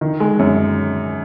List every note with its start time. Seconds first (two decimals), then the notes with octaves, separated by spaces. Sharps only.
0.01 D#3
0.20 G#3
0.39 F#2